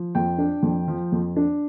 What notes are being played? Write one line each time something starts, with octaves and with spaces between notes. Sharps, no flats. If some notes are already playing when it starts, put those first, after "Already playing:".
Already playing: F3
F2 G5
D4
F2
F3
F2
D4